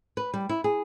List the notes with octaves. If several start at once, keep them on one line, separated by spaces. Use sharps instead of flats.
B4
G3
E4
G#4